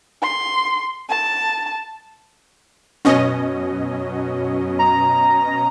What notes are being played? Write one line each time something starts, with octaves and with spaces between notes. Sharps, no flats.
C6
A5
F#2 B2 F#3 C#4 D#5
A#5